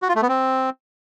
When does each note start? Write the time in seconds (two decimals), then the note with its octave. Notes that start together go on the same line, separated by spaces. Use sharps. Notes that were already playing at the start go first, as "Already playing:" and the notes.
0.02 F#4
0.09 F4
0.15 A3
0.22 B3
0.29 C4